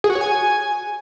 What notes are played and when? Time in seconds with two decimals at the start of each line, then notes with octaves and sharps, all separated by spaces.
0.04 G#4
0.10 F#4
0.15 C#5
0.21 G#5